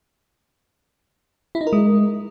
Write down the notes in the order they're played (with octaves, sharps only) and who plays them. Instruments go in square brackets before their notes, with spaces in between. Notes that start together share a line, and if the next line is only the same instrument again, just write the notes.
[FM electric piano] E4
D#4
A#4
G#3